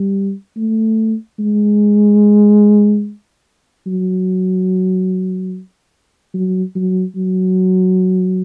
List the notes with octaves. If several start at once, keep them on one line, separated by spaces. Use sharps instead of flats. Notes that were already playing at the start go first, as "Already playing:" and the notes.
Already playing: G3
A3
G#3
F#3
F#3
F#3
F#3